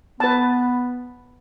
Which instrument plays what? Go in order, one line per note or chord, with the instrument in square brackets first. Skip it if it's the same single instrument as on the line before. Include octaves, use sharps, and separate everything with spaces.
[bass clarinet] B3 [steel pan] B4 A5